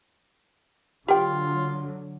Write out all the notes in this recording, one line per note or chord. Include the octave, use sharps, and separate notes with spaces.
D3 F#3 F4 G4 G5